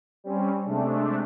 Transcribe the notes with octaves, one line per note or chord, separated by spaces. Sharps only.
G3 C4 C#4
C3 G#3 A3 D4